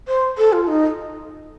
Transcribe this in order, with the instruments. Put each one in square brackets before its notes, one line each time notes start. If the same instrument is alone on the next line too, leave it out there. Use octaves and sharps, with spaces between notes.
[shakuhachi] C5
A4
F4
D#4